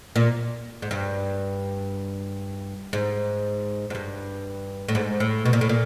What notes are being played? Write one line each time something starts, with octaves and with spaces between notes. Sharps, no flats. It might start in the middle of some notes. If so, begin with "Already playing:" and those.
A#2
G#2
G2
G#2
G#2
G2
A2
G#2
A2
B2
A#2
A2
A#2